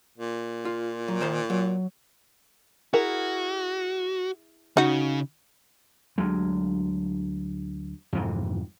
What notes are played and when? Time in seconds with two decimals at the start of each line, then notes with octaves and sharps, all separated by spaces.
0.18 A#2
0.65 F4
1.08 F#3
1.21 D#3 C5 C6
1.50 F#3
2.94 E4 F#4 G#4 A#4
4.77 C#3 D#4 F#4
6.18 D2 F#3 G#3
8.13 F2 G#2 C3 E3